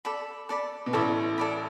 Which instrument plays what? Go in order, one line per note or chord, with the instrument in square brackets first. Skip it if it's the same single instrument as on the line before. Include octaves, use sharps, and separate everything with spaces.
[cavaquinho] A4 D5 B5
A4 D5 B5
[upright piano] B2
[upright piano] A1 A2 [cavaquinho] A4 D5 B5
[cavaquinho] A4 D5 B5